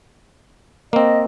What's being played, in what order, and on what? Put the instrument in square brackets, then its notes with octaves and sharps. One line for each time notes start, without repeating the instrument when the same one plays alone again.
[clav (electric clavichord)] A#3 C4 [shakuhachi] D#5